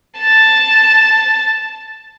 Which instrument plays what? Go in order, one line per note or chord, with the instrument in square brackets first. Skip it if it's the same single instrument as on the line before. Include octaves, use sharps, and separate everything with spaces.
[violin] A5 A6